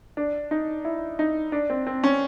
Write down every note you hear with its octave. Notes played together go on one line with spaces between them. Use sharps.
D4
D#4
E4
D#4
D4
C4
C4
C#4